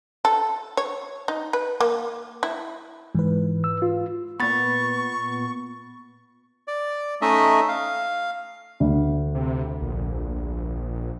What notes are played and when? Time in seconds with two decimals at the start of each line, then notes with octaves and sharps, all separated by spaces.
0.25 A4
0.77 C#5
1.28 D#4
1.53 B4
1.80 A#3
2.43 E4
3.15 G#2 E3 B4
3.64 E6
3.82 F4
4.40 A#2 B3 B5 C#6 A6
6.68 D5
7.22 A3 C#4 D#4 D#5 E5
7.68 F5
8.80 D2
9.34 C3
9.82 A#1